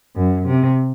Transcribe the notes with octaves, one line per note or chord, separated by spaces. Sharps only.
F#2
C3